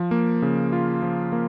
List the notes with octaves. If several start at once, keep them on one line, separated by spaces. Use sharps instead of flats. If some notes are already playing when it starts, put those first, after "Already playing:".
Already playing: F3
A#3
C#3
F4
F3
A#3